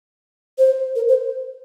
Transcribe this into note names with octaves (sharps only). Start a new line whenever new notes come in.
C5
A#4
C5